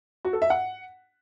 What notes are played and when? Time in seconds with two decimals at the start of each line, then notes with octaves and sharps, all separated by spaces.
0.25 F#4
0.33 A4
0.42 E5
0.50 F#5